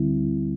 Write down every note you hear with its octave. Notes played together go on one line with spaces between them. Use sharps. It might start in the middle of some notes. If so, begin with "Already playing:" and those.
Already playing: D2 D3 G3 C4 E4